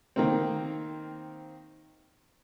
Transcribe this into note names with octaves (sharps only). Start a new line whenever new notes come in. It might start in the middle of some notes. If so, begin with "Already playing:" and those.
D#3 A#3 C4